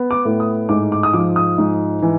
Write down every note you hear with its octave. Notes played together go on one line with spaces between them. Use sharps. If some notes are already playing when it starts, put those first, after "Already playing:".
Already playing: B3
D6
A2
D#6
G#2 D6
D6
D#6
F3 D6
D#6
G#2
E3